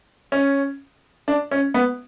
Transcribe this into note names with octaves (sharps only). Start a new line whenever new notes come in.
C#4
D4
C#4
B3